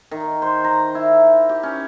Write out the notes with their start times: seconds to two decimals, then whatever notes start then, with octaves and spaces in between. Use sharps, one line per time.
0.11 D#3
0.42 C5
0.64 A#5
0.95 E4
1.49 G4
1.63 C#4